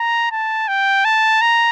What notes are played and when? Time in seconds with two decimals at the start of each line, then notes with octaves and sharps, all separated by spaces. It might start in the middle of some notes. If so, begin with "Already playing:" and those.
Already playing: A#5
0.32 A5
0.68 G5
1.05 A5
1.42 A#5